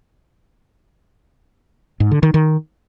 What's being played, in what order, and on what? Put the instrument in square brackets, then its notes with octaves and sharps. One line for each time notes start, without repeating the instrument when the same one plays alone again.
[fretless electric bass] G#2
D3
D#3
D#3